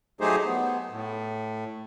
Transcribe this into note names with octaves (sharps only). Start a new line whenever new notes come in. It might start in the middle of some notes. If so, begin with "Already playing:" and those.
F#3 A3 D#4 G4 G#4 C5
B3
A2